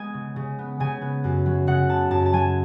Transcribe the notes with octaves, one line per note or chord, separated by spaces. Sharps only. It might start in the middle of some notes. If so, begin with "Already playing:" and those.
Already playing: G#3 B3 G#5
C#3
C#3
B3
C#3 G#5
B3
F#2
F#3
C#3 F#5
B3 A5
F#2 A5
A5
F#3 G#5